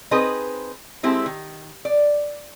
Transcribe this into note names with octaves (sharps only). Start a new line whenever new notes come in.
C4 D#4 G#4 B4 C5 D#5
G#3 C4 E4 G4 A4
D#3
D5